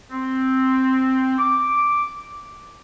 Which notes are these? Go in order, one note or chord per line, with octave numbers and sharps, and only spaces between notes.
C4
D6